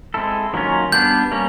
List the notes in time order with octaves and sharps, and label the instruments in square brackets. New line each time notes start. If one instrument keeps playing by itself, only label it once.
[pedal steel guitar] G#3 C4 E4 A4
D#3 F#3 A#3 C#4 F4
[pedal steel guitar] G3 B3 D4 [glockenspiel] G6
[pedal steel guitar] G3 A#3 C#4